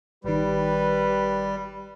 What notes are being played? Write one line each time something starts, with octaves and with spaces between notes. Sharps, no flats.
G#1 D#3 G3 G4 B4